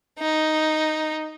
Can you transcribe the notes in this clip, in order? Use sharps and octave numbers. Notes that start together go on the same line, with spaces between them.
D#4